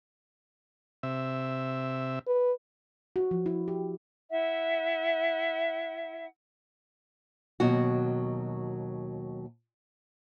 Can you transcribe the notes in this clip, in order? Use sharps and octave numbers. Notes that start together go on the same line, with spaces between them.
C3 E5
B4
F#4
F3
E4
G4
E4 E5 F#5
D#2 B2 F#3 F#4